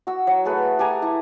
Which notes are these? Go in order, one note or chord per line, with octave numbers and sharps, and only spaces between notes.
F#4 E6
F#3
A3 G#4 A4 B4
G4 A4 G#5 A#5
E4